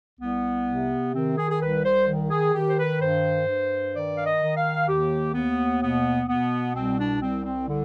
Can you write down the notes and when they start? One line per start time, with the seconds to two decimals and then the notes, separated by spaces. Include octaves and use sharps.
0.20 C2 B3
0.67 C3
1.14 D#3 C4
1.37 G#4
1.50 G#4
1.60 C2 B4
1.84 C5
2.07 D#3
2.30 G#4
2.53 D#3 G4
2.68 C5
2.78 B4
3.00 G2 C5
3.47 G2
3.94 D#3 D5
4.16 F5
4.25 D#5
4.41 D#3
4.56 F5
4.87 D#2 G4
5.33 D#2 B3
5.80 B2 B3
6.27 B2 B3
6.74 C2 C4
6.97 D4
7.20 C2 C4
7.45 C4
7.68 D3